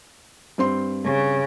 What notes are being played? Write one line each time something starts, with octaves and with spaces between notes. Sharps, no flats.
G2 C4 C6
C#3